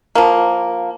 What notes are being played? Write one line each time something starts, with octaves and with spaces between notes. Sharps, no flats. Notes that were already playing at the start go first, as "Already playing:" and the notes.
F3 A#3